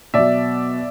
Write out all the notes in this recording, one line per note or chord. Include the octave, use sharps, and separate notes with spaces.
B2 F#3 D5 E5